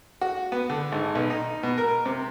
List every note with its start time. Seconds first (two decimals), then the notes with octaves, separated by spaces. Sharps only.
0.21 F#4
0.52 B3
0.70 D3
0.92 G#1
1.15 B1
1.30 D#4
1.63 B2
1.78 A#4
2.06 C3